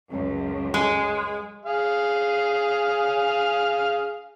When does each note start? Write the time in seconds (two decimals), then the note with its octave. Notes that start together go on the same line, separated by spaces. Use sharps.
0.10 C#2 F#2
0.74 G#3
1.65 G#4 F5